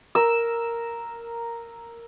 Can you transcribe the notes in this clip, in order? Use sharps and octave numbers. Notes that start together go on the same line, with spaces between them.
A#4 E6